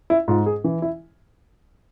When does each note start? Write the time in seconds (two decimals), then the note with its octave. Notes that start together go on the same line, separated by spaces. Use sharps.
0.10 E4
0.28 G#2 F4
0.46 G#4
0.64 E3
0.82 E4